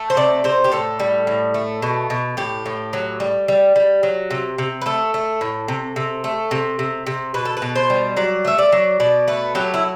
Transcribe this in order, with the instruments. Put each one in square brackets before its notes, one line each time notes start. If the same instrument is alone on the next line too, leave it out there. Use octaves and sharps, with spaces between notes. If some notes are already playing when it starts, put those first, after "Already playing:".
Already playing: [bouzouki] A3
C5
C3 D5
C3 C5
G4
A2 A4
G3
A2
A3
B2
B2
A2 G4
A2
F#3
G3
G3
G3
F#3
C3
C3
B4
A3 A4
A3
A2
C3
C3
A3
C3
C3
C3
B2 B4
A4
B4
B2
C5
G3
F#3 D5
A3 E5
D5
F#3
B2 D5
A3 B4
F#3 G4
E4